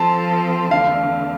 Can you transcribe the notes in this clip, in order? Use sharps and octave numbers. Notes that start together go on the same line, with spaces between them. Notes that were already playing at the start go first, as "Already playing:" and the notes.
Already playing: F3 C4 F4 A4 A5
E2 D3 A3 F5